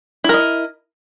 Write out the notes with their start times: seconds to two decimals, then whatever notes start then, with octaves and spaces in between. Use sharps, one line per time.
0.24 E4
0.29 A#4
0.34 D#5